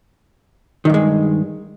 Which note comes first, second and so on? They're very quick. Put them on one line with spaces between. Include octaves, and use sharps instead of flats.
D#3 G2 G#3